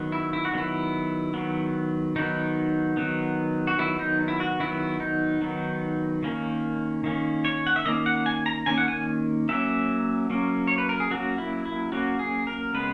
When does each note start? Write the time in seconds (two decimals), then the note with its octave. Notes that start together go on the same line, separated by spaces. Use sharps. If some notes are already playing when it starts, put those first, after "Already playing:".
Already playing: D#3 F#3 B3
0.12 E4
0.33 E4
0.45 F#4
0.53 D#3 F#3 B3 E4
1.34 D#3 F#3 B3
2.16 D#3 F#3 B3 D#4
2.97 D#3 F#3 B3
3.67 F#4
3.78 D#3 F#3 B3 E4
3.99 D#4
4.28 E4
4.40 F#4
4.60 D#3 F#3 B3 E4
5.00 D#4
5.41 D#3 F#3 B3
6.23 D#3 A#3 C#4
7.04 D#3 A#3 C#4
7.45 C#5
7.67 F#5
7.76 E5
7.85 D#3 A#3 C#4 D#5
8.06 F#5
8.26 G#5
8.46 A#5
8.66 D#3 A#3 C#4 G#5
8.78 F#5
8.88 G#5
9.49 F#3 A#3 C#4 E5
10.30 F#3 A#3 C#4
10.67 C#5
10.78 B4
10.89 A#4
11.00 G#4
11.11 F#3 A#3 C#4 F#4
11.38 E4
11.65 E4
11.92 F#3 A#3 C#4 F#4
12.19 G#4
12.47 A#4
12.74 C#3 G#3 B3 B4